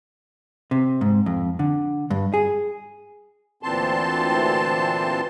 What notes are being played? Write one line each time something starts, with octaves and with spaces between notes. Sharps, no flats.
C3
G#2
F2
D3
G2
G#4
D2 A#2 E3 C4 A5 C6